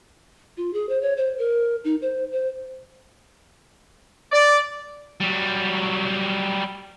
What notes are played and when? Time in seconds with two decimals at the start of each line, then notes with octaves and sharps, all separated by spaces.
0.57 F4
0.73 G#4
0.89 C5
1.02 C#5
1.17 C5
1.39 A#4
1.85 D#4
2.02 C5
2.32 C5
4.32 D5
5.21 F#3 G3